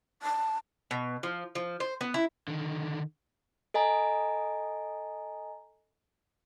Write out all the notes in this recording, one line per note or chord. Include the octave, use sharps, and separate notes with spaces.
A5
B2
F3
F3
C5
B3
E4
D3 D#3
A4 D#5 G#5 A#5